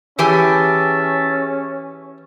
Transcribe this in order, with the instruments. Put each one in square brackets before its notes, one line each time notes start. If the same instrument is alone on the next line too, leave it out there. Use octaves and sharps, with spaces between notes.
[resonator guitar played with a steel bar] E3 G4 G#5 [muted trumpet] C#4 [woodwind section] G#4 E5 A5